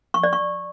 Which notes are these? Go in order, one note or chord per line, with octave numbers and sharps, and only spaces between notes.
C#6
D5
C#6